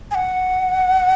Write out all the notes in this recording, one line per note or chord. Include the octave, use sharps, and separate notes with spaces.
G#5
F#5